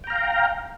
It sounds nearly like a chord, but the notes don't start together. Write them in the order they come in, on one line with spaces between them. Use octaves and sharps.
G5 A#5 F5